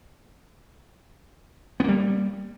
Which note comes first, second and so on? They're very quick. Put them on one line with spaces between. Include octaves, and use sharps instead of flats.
B3 A#3 G3